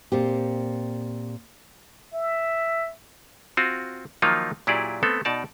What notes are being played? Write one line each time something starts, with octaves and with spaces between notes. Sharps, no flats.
A#2 C4 G4
E5
C4 F4 F#4
D#3 F3 F#3 A#3 D#4 F4
A#2 F#3 E4 G4 G#4 D5
A3 B3 C4 A4
B2 D#4 D5 A5